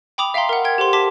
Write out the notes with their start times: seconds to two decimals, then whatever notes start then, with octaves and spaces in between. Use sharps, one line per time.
0.18 G5 B5 D6 D#6 F7
0.34 E5 F5 G5 A#5 C6
0.49 A#4 F#5
0.64 A#4 G5 G#6
0.78 G4 A4 C5 C6
0.93 A5 C6 D6 B6